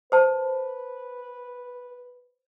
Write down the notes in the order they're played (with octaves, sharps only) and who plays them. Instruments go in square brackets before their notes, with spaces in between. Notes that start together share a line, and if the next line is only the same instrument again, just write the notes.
[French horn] B4 [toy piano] C5 A5